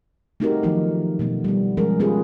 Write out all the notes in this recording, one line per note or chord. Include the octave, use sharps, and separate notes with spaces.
A3 C4 D#4 F#4 G4 A#4
D#3 F3 F#3 A3 B3 D#4
B2 A3 B3
G3 B3
F3 G3 G#3 C#4 G#4 A#4
B3 C#4 F4 G4 G#4 B4